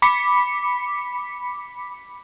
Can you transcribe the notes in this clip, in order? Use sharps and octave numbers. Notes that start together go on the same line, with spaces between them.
B5 D6 B6 C#7